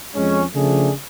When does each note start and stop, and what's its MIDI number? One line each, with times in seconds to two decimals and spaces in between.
0.15 0.42 41
0.15 0.42 56
0.15 0.42 61
0.55 0.92 49
0.55 0.92 53
0.55 0.92 57
0.55 0.92 62
0.55 0.92 68